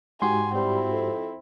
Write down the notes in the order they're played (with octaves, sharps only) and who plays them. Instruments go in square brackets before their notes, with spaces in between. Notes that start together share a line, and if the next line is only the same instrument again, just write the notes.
[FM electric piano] G#2 F#4 G4 [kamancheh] G#5 [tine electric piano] C6
[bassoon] G3 [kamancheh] C4 E4
[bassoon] F2